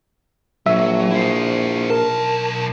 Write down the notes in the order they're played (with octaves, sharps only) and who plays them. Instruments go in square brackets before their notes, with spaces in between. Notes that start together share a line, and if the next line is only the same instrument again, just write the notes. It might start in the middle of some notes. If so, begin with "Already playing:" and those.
[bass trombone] A#1 [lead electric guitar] F#3 [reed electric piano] E5
[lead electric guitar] E4 C5
[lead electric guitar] B1 A5 [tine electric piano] A#4